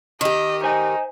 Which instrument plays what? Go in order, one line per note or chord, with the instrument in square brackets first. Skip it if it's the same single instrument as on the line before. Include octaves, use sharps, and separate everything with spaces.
[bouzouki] D#3 G4 [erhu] D#5
[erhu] D#4 [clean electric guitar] C5 D#5 G#5